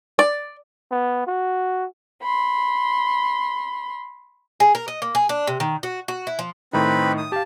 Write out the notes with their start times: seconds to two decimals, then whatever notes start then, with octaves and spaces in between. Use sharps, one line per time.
0.19 D5
0.91 B3
1.27 F#4
2.22 B5 C6
4.60 G#4
4.75 A#4
4.88 D#5
5.02 A#3
5.15 G#4
5.29 D4
5.47 C3
5.60 D#3
5.83 F#4
6.08 F#4
6.27 E4
6.39 F3
6.73 A2 D#3 C4 D#4 B4 B5
7.17 D#6
7.32 G4 F5 A5